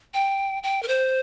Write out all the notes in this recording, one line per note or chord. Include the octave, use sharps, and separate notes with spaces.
G5
G5
A#4
C5